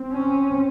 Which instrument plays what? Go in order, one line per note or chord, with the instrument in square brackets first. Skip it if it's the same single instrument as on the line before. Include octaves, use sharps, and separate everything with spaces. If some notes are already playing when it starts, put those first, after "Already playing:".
Already playing: [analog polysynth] C4
[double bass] C#4